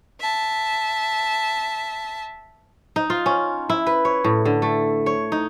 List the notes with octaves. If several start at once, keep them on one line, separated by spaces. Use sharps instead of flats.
E5 A5
D#4
F4
C#4
E4
B4
C#5
A2
D3
A3
C#5
D#4